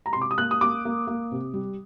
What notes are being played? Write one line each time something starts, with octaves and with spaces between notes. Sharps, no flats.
A#5
C3 C6
D6
D#6
A#3 F#6
D#6
A#3 D6
A#3
A#3
C3
G3